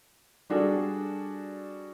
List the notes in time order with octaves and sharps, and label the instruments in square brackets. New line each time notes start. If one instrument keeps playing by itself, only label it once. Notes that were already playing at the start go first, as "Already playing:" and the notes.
[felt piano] G3 D4 F#4 G#4 A4